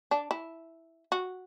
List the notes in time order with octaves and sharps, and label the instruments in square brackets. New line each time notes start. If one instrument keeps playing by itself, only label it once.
[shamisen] D4
E4
F#4